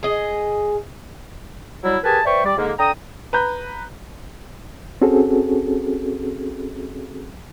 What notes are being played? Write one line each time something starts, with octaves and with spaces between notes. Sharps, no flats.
G#4 D#5
F#3 G3 E4
G4 G#4 A#4 B4 G#5 A5
B4 C5 D5 E5 G5 C#6
G3 D5
G#2 D3 A#3
D3 G5 A#5 D#6
B4 A#5 G6
C4 C#4 F#4 G#4 A4